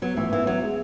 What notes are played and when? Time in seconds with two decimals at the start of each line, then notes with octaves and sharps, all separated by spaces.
0.02 F#3 B3
0.17 A1 E3
0.32 E3 B3
0.47 F#3 B3
0.62 G#3